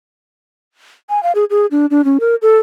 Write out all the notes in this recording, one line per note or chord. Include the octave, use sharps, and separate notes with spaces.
G#5
F5
G#4
G#4
D4
D4
C#4
A#4
A4